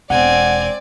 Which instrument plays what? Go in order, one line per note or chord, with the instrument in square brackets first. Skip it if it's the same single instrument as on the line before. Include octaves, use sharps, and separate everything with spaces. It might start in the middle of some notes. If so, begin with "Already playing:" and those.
[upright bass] E1 [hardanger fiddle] C4 G#5 [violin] D5 [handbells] F#5